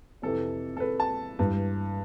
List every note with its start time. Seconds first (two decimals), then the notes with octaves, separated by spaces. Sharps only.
0.22 F2 C3 E3 A4
0.77 A4
0.80 B4
1.00 A5
1.39 G2 E3